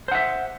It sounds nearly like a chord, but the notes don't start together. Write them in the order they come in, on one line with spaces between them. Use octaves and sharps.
C5 F#5 E5